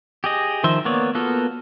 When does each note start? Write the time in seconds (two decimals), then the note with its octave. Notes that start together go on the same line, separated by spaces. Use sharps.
0.24 G4 G#4 D#5
0.64 D#3 F3 C5 E5
0.85 A#3 B3 C#5 D5
1.15 A#3 B3 F4 F#4 A4